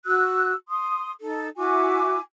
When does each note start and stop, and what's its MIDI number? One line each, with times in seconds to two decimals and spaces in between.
0.05 0.53 66
0.05 0.53 88
0.05 0.53 90
0.69 1.10 84
0.69 1.10 87
1.21 1.48 63
1.21 1.48 69
1.57 2.19 64
1.57 2.19 66
1.57 2.19 80
1.57 2.19 86